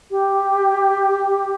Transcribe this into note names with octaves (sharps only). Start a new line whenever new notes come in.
G4